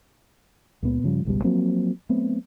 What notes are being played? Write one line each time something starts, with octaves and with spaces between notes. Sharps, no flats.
C#2 A#2 B3
G2 C#3 F3 G3
G#1 C#2 B2 G3
F3 F#3 A#3 C4
F#3 A3 B3 C4